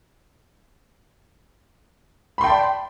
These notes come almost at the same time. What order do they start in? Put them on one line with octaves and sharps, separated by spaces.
B5 C6 G5 A5 D5